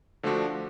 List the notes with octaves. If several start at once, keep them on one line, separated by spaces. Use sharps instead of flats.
D3 F3 A3 D4 F#4